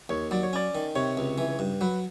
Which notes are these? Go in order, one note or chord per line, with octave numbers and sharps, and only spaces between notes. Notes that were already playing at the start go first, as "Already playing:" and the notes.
D#2 C#5
F#3 D5
C#5
C#4 D5
D#3
C3 C#5
C#2
E3
G2
F#3 B4